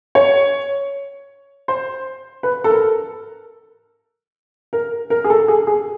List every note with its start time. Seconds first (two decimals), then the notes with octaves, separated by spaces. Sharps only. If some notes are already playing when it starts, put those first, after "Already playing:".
0.15 C#5
1.68 C5
2.43 B4
2.64 A4
2.70 A#4
4.73 A#4
5.10 A#4
5.24 G#4
5.30 A4
5.48 G#4
5.67 G#4